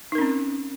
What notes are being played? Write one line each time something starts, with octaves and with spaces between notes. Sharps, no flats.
C4 C#4 D#4 A#4